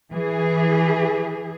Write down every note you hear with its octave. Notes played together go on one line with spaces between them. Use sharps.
E3 G#4